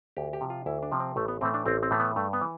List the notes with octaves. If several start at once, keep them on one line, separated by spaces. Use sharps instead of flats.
D2 G4
G4
C3 F3
F4
D2 E4
D4
C3 F3
C4
A1 A3
B3
A2 E3 A3 C4
D4
A1 C4
C4
A2 E3 A3
B3
G2 A3
B3
E3